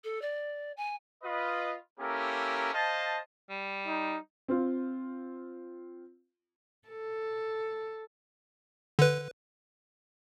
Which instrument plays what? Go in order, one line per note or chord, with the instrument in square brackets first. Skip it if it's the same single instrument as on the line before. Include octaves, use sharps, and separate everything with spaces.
[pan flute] A4
D5
G#5
[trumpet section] F4 B4 D#5
A#3 C#4 E4 G4 A4 A#4
C5 D#5 F5 A5
[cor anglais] G3
[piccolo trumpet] D#4
[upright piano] C4 F4
[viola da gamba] A4
[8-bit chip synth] D3 B4